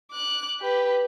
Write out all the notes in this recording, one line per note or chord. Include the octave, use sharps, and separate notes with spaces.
D6 F#6
G4 B4